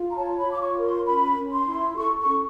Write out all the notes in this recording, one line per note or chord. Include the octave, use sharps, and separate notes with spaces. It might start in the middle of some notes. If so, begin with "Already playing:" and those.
Already playing: F4
A#5
C#5 A5
B5
F4
D6
C#6
A#4
C6
C#4 B5
C#4
C6
E4
A4 C#6
C#6
C#4